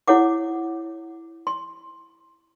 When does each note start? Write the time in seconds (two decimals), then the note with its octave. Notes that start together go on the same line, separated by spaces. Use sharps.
0.08 E4 A4 C#5 F#5 D6
1.47 C6